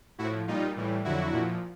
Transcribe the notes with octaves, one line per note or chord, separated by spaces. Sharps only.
A2 F3 E4 F#4
A#2 G3 D#4 F4
A2 E3 G3
F2 D3 F#3 E4 F#4
A#2 F3